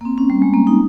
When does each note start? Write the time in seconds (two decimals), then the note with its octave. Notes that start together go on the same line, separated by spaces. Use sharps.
0.01 A#3
0.05 C4
0.18 C#4
0.30 G3
0.42 G#3
0.54 A#3
0.67 D#4